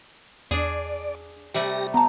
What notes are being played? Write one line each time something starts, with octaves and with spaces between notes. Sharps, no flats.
E2 D4 G#4 D5
C3 G3 A3 G4 A#6
B3 A5 A#5